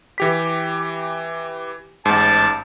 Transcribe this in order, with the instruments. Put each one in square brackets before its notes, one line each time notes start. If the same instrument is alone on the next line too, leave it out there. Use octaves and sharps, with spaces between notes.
[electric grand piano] E3 G4 B6
[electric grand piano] A1 G#2 [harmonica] A5